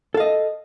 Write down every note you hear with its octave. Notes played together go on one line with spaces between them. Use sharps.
A4 D#5 F5